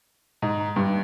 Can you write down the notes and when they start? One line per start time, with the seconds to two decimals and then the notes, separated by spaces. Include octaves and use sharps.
0.42 G#2
0.76 G2